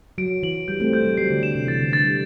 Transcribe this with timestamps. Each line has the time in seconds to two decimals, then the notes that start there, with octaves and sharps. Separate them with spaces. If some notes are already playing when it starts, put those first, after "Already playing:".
0.18 F#3 D7
0.43 E3 F#7
0.68 G3 G6
0.80 A3 C4
0.93 A3 G6
1.05 G3
1.17 F#3 C7
1.30 D3
1.43 D3 E7
1.55 C3
1.68 E3 A6
1.80 D3
1.92 D3 A6
2.05 G3